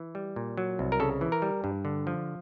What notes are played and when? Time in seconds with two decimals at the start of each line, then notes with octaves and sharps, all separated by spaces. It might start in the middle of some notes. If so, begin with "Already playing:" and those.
Already playing: E3
0.15 G3
0.36 A#2
0.57 F#3
0.79 C2
0.92 A#4
1.00 C#3 A4
1.21 E3
1.32 A#4
1.42 G3
1.64 G2
1.85 D3
2.07 F3